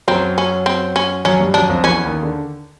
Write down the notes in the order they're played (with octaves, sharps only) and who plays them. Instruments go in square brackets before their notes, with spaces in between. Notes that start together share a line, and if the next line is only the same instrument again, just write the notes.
[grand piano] F#2 F#3 [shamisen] C4
[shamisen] C#4
C4
C#4
[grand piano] F#2 F#3 [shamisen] C#4
[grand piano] G2 G3
[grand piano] F#2 F#3 [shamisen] D4
[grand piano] F2 F3
[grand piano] E2 E3 [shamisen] C#4
[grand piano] D#2 D#3
D3